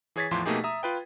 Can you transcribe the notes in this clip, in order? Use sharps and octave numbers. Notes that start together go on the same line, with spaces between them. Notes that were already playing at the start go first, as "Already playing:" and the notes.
E3 G#4 C#5 G#6 A6 B6
E2 A2 F3 C6 D6
B2 A3 A#3 D#4 G4 G#4
E5 A#5 D#6
F4 B4 G5